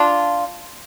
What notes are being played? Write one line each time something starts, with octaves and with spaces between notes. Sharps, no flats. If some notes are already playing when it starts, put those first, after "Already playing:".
Already playing: D4 F4